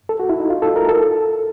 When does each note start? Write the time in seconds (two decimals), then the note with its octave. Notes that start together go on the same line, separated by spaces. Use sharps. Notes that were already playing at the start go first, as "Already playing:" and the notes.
0.09 A4
0.20 F#4
0.29 E4
0.40 D#4
0.50 F4
0.62 A4
0.76 A#4
0.89 A4